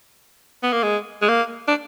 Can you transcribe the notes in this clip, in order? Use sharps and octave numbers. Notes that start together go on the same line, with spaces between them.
B3
A#3
G#3
G#3
A#3
D4